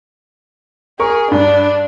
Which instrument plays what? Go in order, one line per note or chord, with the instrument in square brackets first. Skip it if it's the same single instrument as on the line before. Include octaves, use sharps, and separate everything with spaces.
[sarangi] G#4 [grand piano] A#4 C#6
[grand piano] G2 [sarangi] D4